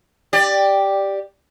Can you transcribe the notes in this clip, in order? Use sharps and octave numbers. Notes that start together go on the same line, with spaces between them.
G4 D5